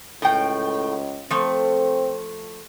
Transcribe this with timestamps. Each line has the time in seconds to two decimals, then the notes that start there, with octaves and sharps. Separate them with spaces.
0.22 C#2 A2 G5
1.30 F3 A3 C4